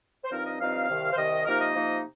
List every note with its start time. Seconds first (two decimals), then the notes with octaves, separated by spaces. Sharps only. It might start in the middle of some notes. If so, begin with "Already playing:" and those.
0.24 C5
0.31 G2 F3 C4 D#4 A#4
0.45 D#5
0.60 G2 F3 C4 D#4 F5
0.88 C2 C3 D#3
1.13 C5
1.17 C2 C3 D#3 D#5
1.46 C3 F3 A#3 D#4 A#4
1.60 D#5
1.75 C3 F3 A#3 D#4